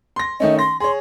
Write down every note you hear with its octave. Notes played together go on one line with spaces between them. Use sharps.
C6 A#6
D#3 A3 C#4 D#5
C6 A#6
G#4 C#5 C6